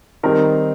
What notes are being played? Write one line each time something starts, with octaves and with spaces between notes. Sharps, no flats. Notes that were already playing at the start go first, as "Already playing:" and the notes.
D#3 G3 C4 D#4 A#4